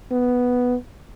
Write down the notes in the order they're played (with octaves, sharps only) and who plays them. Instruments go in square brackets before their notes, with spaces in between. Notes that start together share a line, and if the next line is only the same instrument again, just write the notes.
[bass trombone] B3